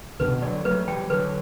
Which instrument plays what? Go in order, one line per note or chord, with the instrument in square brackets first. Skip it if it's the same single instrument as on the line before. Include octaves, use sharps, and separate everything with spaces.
[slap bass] B2 D3 [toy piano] B4
[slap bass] D3 F#3 [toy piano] D5
[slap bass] F#3 A3 [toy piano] B4
[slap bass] E3 G3 [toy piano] G5
[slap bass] D3 F#3 [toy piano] B4